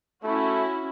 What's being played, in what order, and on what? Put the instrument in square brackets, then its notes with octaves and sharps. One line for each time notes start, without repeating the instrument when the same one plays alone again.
[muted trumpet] A3 [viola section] C#4 E4 F#4